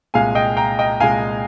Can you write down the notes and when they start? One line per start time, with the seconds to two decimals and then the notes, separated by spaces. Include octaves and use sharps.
0.14 C2 A#2 G#3 F5 G#5
0.35 D#5 G5
0.57 G5 A#5
0.79 D#5 G5
1.00 C2 A#2 G#3 F5 G#5